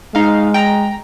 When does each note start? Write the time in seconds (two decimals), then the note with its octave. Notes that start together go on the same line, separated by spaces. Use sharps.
0.15 G#3 D#4 F5
0.54 G5 A#5